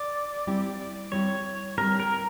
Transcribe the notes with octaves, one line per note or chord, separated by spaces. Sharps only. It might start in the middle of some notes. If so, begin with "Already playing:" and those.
Already playing: D5
G3 C4 E4 G4
G3 C4 E4 G4 C#5
G3 C4 E4 G4 A#4
A#4